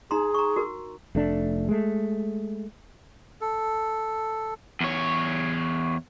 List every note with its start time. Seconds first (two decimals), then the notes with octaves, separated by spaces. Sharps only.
0.11 D#4 G#4 A#5 C6
0.34 A#5 C#6
0.56 F#4 A#4
1.15 F1 A3 D4
1.69 G#3 A3
3.41 A4
4.81 E2 C#5